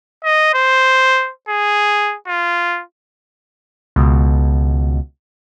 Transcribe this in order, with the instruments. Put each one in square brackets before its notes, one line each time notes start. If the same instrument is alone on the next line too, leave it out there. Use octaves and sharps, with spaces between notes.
[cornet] D#5
C5
G#4
F4
[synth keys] C#2 B2